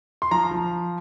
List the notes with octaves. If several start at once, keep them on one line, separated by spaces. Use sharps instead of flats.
C6
F3 A#5
F3